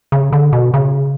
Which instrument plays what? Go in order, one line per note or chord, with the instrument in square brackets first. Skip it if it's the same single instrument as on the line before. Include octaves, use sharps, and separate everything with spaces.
[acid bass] C#3
D3
B2
C#3